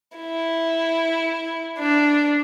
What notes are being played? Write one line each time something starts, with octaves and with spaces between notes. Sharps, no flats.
E4
D4